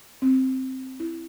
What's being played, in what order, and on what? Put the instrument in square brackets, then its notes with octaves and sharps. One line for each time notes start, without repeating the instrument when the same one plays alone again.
[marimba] C4
E4